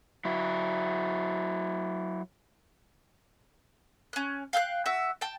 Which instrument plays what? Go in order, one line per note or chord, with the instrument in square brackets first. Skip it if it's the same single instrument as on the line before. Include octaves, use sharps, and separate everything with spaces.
[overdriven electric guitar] F#3 E4
[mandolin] C#4 F#6
F5 G5 F6 F#6
F#4 E5
G5 A5